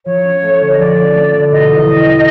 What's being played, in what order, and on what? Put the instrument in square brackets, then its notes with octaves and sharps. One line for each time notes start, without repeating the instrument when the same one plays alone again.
[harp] F3 [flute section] C#5
[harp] C#4
A3
D3
[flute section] D#5
[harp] F3 [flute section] D5
[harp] C#4
A3
D3
[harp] B2 [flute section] D#5
[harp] E2
G3